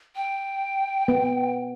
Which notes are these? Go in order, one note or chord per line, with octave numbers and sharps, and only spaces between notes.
G5
B3